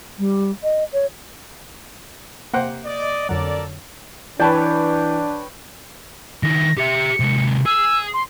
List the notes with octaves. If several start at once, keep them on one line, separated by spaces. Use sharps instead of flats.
G3
D#5
C#5
C3 A#3 C5 F#5 G5
D5 D#5
F2 D3 F#3 A4 A#4 D5
E3 D4 B4 C#5 D5 G5 A5
D#3 E4 A#6
G4 E5 C#7
C3 G#3
G#4 E6
C6